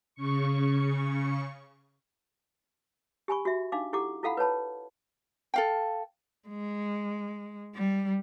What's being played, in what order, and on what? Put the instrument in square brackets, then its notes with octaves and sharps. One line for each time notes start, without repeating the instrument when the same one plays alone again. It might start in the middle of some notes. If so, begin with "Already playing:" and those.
[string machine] C#3 C#6
[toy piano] G4 G#5 B5 C#6
F#4 E5
D4 D#4 F5 D6
E4 G4 A4 F#5 D6
E4 F4 A4 F5 F#5 B5
B4 C#5 A5 B5
[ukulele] A4 F5 G5
[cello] G#3
G3